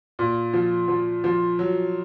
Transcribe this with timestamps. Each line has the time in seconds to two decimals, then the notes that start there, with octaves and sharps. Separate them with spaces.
0.19 A#2
0.54 F3
0.88 F3
1.24 F3
1.59 F#3